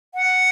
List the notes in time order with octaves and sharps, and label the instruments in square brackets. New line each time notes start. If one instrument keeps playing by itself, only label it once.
[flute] F#5